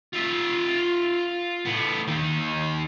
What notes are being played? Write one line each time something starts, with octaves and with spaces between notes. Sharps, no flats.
F4 E5
A2 B3
D#3 A#3